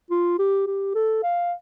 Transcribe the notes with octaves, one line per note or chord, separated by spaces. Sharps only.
F4
G4
G4
A4
F5